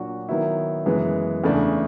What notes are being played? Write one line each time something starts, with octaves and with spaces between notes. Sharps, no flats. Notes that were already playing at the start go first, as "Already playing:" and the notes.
Already playing: A#2 F#3 A#3 D4 F#4
D#3 F#3 B3 E4
F#2 C#3 E3 G#3 B3
E2 C#3 E3 A3 D4